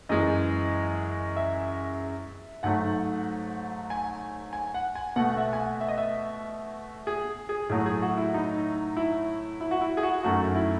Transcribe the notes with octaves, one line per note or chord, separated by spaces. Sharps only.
F#2 E3 G#3 D#5
E5
G#2 F#3 A3 F#5
G#5
G#5
F#5
G#5
B2 A3 F#5
F#5
E5
G#5
F#5
E5
D#5
E5
G#4
G#4
A2 F#3 A3 G#4
G#4
F#4
E4
D#4
E4
E4
F#4
E4
G#4
F#4
F#2 D#3 F#3 A3 F#4
E4